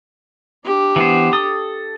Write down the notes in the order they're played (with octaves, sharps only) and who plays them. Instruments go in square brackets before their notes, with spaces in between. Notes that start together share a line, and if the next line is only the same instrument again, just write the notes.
[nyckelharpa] D4 G4
[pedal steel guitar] E3 B3 C5
A4 D#6